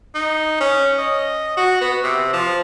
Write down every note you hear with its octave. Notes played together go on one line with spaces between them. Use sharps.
D#4
C#4
D#5
F#4
B3
C3
F3